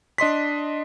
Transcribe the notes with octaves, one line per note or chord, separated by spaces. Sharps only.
D4 D#5 C6 B6